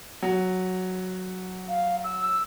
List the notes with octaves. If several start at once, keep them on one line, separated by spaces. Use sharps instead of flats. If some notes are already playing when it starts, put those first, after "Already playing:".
F#3
F5
E6